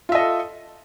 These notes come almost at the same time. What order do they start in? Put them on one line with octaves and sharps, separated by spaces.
F4 E5 D#5 A4